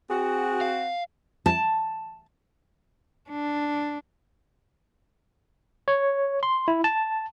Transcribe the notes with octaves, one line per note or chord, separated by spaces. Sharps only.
C4 F#4 G#4
F5
A5
D4
C#5
C6
E4
A5